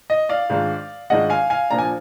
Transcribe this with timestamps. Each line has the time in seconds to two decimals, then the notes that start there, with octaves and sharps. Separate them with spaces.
0.10 D#5
0.29 D5 F5
0.50 G#2 D#3 G#3 D4 F4
1.10 G#2 D#3 G#3 D4 F4 D#5 F#5
1.30 F5 G#5
1.50 F5 G#5
1.70 A#2 F3 A#3 D4 A#5
1.78 G#5